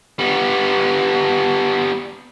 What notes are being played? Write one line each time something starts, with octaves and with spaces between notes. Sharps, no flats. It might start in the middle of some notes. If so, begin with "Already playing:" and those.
G3 B3